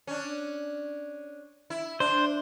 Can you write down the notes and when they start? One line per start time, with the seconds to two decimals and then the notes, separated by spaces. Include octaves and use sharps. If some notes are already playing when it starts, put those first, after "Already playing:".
0.07 C#4 D4
1.70 E4
2.00 D4 C5